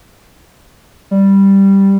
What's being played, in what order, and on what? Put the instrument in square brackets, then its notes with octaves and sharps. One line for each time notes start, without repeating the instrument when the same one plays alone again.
[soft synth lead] G3